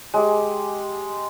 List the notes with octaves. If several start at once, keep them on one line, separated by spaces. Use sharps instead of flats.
G#3 G4